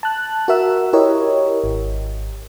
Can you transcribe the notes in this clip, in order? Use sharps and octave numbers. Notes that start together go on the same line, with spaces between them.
A5 F#6
F#4 A#4 E5 E6
E4 G4 A#4 C#5 D#5
G#1